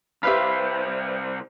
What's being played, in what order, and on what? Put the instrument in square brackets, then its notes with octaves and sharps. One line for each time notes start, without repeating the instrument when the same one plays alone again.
[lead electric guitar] C2 C5 [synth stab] G4 B4 F5 [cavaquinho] E5 B5